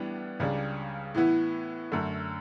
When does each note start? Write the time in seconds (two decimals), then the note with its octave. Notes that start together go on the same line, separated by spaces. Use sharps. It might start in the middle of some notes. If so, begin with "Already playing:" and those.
Already playing: A2 E3 G3 B3 D4
0.40 C#2 C#3 G3 D4
1.15 A2 E3 B3 E4
1.92 F#2 D3 A3